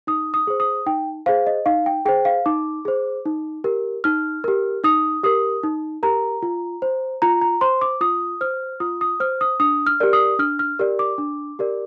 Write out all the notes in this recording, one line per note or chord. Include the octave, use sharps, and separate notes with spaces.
D#4 D#6
D#6
G#4 C5
D#6
D#4 G5
G#4 C5 F5
D#5
D#4 F5
G5
G#4 C5 G5
F5
D#4 D6
G#4 C5
D#4
G4 A#4
D#4 F6
G4 A#4
D#4 D#6
G4 A#4 D#6
D#4
G4 A#4 A#5
F4
C5
F4 A#5
A#5
C5 C6
D6
F4 D#6
C5 F6
F4 D#6
D#6
C5 F6
D#6
D4 D#6
F6
G4 A#4 D5
D#6
D4 F6
F6
G4 A#4 D5
D6
D4
G4 A#4 D5